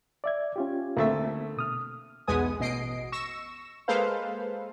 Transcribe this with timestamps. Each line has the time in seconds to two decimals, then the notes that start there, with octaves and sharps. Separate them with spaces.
0.24 D5 E5 G#6
0.56 C#4 F4 G4
0.97 D2 A3 A#3 C4 E5
1.57 B2 D#6 F6
2.27 B1 E2 G#3 B3 G#5 D#6
2.60 A1 B2 D#5 C7 D7
3.12 C#6 E6 A#6 E7
3.88 G#3 A#3 A4 B4 C5 F5